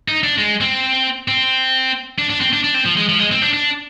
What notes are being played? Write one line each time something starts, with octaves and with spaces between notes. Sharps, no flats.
D#4
D4
G#3
C4
C4
D4
D4
C4
D4
D4
C4
F3
G#3
F3
G#3
C4
D4
D4